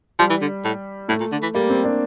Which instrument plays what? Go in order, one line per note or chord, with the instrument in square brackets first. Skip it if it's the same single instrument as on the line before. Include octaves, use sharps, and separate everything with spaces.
[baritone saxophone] F3 [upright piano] G3
[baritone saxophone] E3
D3
A2
[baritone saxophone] A2 [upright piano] A3
[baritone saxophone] A#2
D3
E3
[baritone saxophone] G3 [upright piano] A#3
[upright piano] C4
D4